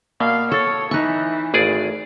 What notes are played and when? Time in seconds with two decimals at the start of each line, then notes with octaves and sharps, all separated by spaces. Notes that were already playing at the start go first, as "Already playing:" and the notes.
0.20 B2 A#3 D5 F5
0.52 A4 C#5 C#6 A6
0.91 E3 D#4 C#6 E6 F#6
1.54 G#1 A3 G#4 D5 F5